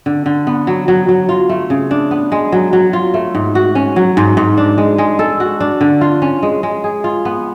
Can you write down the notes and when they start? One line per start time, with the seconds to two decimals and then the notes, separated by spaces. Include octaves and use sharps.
0.06 D3
0.26 D3
0.47 B3
0.67 F#3
0.88 F#3
1.09 F#3
1.29 F4
1.49 A3
1.70 C#3
1.91 D4
2.11 B3
2.32 G#3
2.52 F#3
2.73 F#3
2.93 F4
3.14 A3
3.35 G#2
3.55 F#4
3.75 C#4
3.96 F#3
4.17 G#2
4.37 G#2
4.57 D4
4.78 G#3
4.98 G#3
5.19 A4
5.40 F#4
5.60 D4
5.81 D3
6.01 F4
6.22 C#4
6.43 G#3
6.63 G#3
6.84 G#4
7.04 F4
7.25 B3